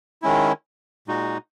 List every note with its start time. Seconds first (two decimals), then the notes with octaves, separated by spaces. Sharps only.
0.22 D#3 G#3 C#4 E4
1.08 A#2 G#3 D#4 F#4